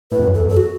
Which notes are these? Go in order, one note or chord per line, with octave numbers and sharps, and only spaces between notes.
A2 B4
E2
F#2
E2 A4
F#2
A4
F#4